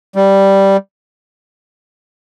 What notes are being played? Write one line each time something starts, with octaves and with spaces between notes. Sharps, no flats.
G3